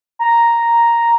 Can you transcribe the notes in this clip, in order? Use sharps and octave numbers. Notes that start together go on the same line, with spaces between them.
A#5